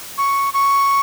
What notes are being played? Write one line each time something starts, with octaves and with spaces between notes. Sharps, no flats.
C#6
C#6